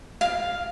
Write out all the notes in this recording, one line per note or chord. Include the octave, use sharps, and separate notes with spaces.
F5